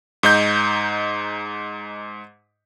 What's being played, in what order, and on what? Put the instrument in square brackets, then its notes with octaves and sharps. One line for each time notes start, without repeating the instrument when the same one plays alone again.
[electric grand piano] G#2 D#4 G6